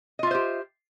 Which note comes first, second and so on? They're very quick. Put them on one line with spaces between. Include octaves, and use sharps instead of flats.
D#5 F4 E5 C5 G4